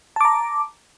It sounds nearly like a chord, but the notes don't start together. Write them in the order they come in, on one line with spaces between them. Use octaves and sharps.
A5 D6 A#5